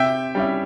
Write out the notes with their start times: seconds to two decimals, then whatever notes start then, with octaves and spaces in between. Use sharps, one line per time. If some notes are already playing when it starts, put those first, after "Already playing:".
Already playing: C3 E5 G5
0.35 G3 C#4 E4